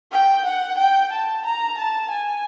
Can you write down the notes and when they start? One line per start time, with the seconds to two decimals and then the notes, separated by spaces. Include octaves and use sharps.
0.12 G5
0.45 F#5
0.78 G5
1.12 A5
1.45 A#5
1.78 A5
2.11 G#5